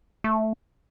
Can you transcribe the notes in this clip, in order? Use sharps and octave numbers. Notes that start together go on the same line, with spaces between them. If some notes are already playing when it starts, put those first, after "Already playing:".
A3